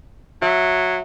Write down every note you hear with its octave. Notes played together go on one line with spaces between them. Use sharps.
F#3 E5